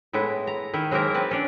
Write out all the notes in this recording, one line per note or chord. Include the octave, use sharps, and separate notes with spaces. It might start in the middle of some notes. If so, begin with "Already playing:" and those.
A2 G#3 B3 E4
A#5
D#3 E4
F#3 G#3 A#3 C4 A#4 E5
C4 B4 A5
C#4 D4